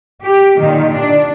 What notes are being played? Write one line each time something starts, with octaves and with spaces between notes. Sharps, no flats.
G4
A#2 D3 D#3
D4